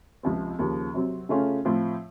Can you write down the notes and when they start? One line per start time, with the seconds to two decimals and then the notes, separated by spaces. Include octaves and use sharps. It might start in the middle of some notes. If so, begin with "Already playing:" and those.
0.23 C#2 C3 F3 C4
0.59 D#2 C#3 F3
0.94 C3 F#3 C4
1.29 C#3 A3 C#4 F4
1.65 A2 F3 C4 F4